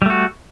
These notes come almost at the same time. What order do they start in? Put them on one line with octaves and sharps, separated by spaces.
G3 A3 F#4